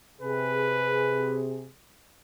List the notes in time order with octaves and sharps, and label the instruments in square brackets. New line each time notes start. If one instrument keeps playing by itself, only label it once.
[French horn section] C3 G#4 [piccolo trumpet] B4